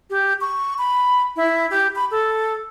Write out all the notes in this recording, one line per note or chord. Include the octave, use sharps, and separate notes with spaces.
G4
C#6
B5
E4
G4
B5
A4